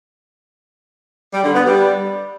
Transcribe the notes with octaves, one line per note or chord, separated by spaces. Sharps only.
G3
D3
B3
G3